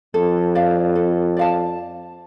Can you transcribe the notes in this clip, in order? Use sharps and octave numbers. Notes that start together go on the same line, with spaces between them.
F2 A4
D5 F5 A5
A4
D5 F5 A5